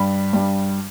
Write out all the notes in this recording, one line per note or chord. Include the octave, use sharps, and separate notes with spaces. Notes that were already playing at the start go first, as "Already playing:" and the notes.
Already playing: G2 G3 B5
G2 G3